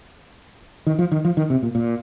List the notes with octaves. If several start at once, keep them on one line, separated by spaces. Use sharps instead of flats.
D#3
F3
D#3
F3
D#3
C3
A#2
A#2